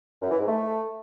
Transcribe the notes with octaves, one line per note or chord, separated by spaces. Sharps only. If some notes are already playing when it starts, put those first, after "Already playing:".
F#2
E3
G#2
A3